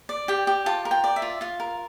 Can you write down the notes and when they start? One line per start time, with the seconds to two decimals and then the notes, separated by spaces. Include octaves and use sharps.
0.09 D5
0.28 G4 G5
0.47 G4
0.66 F4 A5
0.85 A#4
0.91 G5
1.04 D5
1.16 E5
1.22 F4
1.41 F4 F5
1.60 A#4